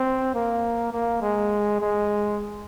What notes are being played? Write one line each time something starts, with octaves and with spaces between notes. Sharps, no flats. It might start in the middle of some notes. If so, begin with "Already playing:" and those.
Already playing: C4
A#3
A#3
G#3
G#3